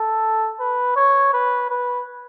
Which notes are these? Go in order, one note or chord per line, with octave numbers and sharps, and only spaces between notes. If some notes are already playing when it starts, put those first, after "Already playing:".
Already playing: A4
B4
C#5
B4
B4